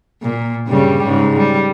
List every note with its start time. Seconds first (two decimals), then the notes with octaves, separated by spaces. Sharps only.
0.22 A#2
0.67 G2 C#3 G3
1.03 G#2 C#3
1.37 G3